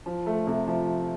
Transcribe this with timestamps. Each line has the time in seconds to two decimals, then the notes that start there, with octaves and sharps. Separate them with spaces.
0.06 F3
0.26 A3
0.47 C3
0.67 F3